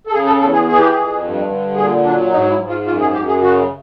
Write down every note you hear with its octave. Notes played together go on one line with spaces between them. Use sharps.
A4
C#3 G#4
A4
E2 A4
G#4
E3 G#4
G4
F2 G#4
G2
D3
A#2 G#4
F#3 D4
G#2 D#4
E4
G#2
F4
F#2 F4
G#4
F#2 G4
G#4
C#3 F#4